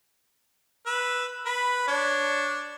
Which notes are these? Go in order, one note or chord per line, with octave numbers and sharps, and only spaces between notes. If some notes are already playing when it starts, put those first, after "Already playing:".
B4 E6
B4 B5
D4 C#5